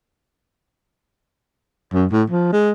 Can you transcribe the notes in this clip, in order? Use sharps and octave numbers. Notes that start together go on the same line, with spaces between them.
F#2
A2
F3
G#3